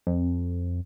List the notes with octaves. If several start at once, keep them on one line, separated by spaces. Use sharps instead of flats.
F2